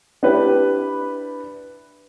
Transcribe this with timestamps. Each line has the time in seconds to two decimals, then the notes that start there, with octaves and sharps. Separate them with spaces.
0.23 D4 E4 G4 B4